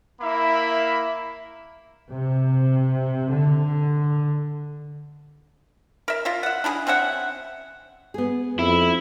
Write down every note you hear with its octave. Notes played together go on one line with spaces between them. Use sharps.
A#3 E4 E5 B5
C3
D3
A#4 E5
F4 D#5 E5
E5 F#5
D4 E4 G4 G#4
C4 C#4 E5 F#5
B3 G#4
F2 E4